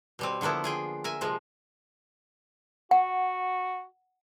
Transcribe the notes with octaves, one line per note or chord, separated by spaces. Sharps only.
B2 G3 C4
D3 F3 A#3 B3 E4
F4 G#4 G5
A#4 E5 G#5
C3 F3 G#3
F#4 F#5